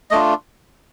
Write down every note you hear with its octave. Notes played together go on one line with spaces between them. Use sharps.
A3 D4 F4 D#5